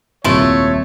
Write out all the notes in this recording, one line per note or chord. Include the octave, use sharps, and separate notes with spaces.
D#1 C2 A#2 A3 E4 F4 C#5